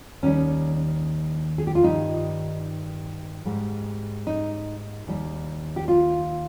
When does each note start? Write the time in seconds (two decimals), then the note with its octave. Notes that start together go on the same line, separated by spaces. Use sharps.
0.23 D#2 D#3 G3 C#4
1.58 G#4
1.67 G4
1.75 F4
1.83 G2 D#3 G3 D#4
3.45 G#2 G3
4.27 D#4
5.07 D#2 D#3 G3
5.76 G4
5.88 F4